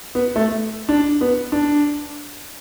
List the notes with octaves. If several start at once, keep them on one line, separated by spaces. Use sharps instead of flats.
B3
A3
D4
B3
D4